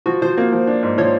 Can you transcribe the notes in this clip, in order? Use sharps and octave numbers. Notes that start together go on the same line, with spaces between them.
F3 F#4
F3 C5
A#3
F3
D4
G#2
F3 C#5